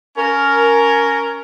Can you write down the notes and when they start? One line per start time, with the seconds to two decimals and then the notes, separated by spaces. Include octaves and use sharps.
0.18 C#4 A#4